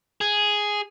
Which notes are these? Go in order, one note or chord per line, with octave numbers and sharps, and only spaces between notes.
G#4